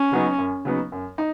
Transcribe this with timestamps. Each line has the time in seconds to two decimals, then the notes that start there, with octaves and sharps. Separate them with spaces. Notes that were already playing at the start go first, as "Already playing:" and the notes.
Already playing: C#4
0.12 C#3 F#3 B3 D#4
0.38 F#2
0.65 C#3 F#3 B3 D#4
0.92 F#2
1.18 D#4